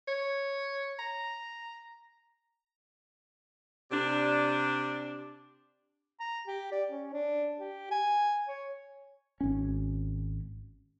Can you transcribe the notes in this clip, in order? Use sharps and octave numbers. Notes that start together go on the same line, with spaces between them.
C#5
A#5
C3 D4
A#5
G4
D5
C#4
D4
G4
G#5
C#5
G#1 C#4